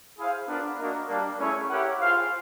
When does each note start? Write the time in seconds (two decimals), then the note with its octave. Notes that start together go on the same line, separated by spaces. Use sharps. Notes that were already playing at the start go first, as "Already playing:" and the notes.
0.18 E4 G#4 C5 F5
0.48 B3 D4 F4 A#4
0.79 A#3 D4 F#4 A#4 D#5
1.08 G3 A#3 D4
1.39 A3 C#4 E4 G#4 C#5
1.69 E4 G4 A#4 C#5 F#5
2.00 F4 G#4 C5 F5